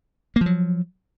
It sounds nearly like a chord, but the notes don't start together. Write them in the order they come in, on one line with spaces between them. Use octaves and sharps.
A#3 F3 F#3